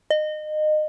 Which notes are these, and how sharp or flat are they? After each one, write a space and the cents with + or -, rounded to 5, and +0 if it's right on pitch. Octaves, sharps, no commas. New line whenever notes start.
D#5 -25